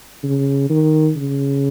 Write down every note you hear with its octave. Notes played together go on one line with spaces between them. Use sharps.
C#3
D#3
C#3